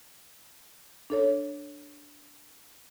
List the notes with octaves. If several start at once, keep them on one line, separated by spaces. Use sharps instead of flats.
D4 A4 C#5